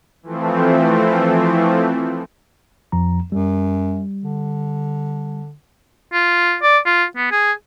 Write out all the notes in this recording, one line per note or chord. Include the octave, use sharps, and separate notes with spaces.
E3 F3 A3 C4
F2 F3 A#5
F#2 G3
D3
F4
D5
F4
B3
G#4